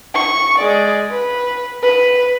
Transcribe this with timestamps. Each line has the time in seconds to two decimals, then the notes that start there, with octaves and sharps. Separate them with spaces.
0.15 C#6
0.58 G#3 D5
1.10 B4
1.83 B4